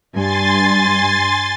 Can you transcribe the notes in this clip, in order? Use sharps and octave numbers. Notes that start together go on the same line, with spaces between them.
G2 G#5 C6 A6